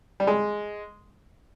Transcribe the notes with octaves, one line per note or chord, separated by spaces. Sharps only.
G3
G#3